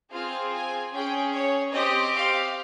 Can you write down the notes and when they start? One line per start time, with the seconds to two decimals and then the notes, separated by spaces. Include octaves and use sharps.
0.11 C4 F4 G#4 F5
0.52 G#5
0.91 C#4 G#4 G5
1.33 C#5
1.72 C4 G4 D#5
2.14 F5